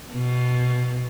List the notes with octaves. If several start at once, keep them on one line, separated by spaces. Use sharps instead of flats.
B2